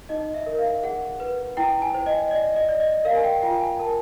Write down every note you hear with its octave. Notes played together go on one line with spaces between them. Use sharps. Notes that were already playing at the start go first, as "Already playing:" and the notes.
D#4 D#5
E5
A#4
F5
G#4 F#5
B4
E4 G5
G#5
C5
D#5
D5 D#5
D#5
D5
D#5
A#4 F5
G#5
G5
F4 G5
G#5
A#4 A5